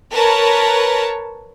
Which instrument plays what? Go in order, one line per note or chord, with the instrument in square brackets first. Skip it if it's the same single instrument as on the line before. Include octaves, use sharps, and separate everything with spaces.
[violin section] A#4 B4 C#5 A5